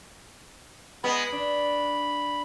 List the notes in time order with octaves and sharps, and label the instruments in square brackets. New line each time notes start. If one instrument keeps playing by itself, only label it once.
[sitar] G#3 B3 [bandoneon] B5
[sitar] D4